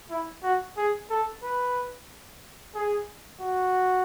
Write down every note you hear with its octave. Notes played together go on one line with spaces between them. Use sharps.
E4
F#4
G#4
A4
B4
G#4
F#4